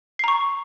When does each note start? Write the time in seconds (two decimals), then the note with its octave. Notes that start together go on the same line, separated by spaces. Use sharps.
0.19 C7
0.24 A#5
0.28 C#6